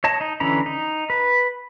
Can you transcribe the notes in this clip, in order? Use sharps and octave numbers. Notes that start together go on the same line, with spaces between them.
C#5 D#5 A5
D#4
D3 E3 C#4 A#5 B5
D#4
B4